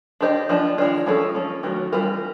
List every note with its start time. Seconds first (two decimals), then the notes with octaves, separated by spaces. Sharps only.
0.21 D4 G4 C5 D#5
0.49 F3 A#3 D4
0.78 D#3 G#3 B3 D4 F4
1.06 F3 G#3 C#4 F4 A4
1.35 F3 A#3 C#4
1.63 D#3 F#3 A3 C#4 F#4
1.92 E3 G3 C4 F4 A#4